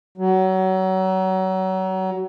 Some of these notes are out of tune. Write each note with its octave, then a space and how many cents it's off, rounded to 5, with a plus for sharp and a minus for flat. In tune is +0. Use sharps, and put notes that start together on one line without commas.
F#3 +30